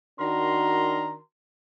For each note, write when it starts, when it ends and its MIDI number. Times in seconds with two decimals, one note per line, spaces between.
0.19 1.16 51
0.19 1.16 62
0.19 1.16 66
0.19 1.16 70
0.19 1.16 82
0.19 1.16 84